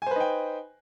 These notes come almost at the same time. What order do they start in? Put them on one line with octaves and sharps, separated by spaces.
G#5 C5 B4 D#4 G5